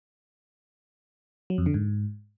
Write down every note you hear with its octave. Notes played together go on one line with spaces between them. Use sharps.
F#3
F2
D3
G#2